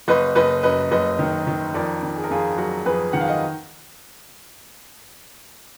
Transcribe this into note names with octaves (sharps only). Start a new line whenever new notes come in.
F#1 B4 D#5
F#1 B4 D#5
F#2 B4 D#5
F#1 B4 D#5
D#3
D#3
F2 A#4 D5
D#3
G#4
A#4
F2 F4 G#4
F#3 F#4 A#4
F2 G#4 B4
D#3 F#5
F5
D#5 F#5